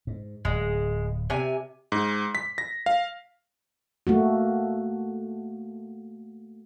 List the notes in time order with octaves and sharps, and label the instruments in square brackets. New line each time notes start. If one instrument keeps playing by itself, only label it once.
[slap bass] G#2
[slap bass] D1 [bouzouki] G#3
[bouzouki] C3 G#5
[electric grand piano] G#2
B6
A#6
F5
[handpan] A3 A#3 F#4